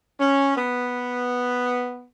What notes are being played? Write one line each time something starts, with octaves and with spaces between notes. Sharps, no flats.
C#4
B3